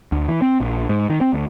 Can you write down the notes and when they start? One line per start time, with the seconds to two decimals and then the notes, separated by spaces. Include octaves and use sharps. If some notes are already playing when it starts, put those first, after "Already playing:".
0.12 D2
0.28 E3
0.42 C4
0.60 A#1
0.89 G#2
1.10 D#3
1.21 C4
1.33 D2